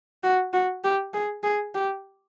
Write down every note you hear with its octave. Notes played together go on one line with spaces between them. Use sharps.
F#4
F#4
G4
G#4
G#4
G4